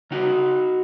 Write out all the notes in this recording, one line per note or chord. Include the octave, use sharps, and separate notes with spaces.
C#3 D#4 F#4